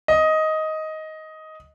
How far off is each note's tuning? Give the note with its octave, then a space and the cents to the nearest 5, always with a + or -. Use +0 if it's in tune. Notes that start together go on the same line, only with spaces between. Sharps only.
D#5 +10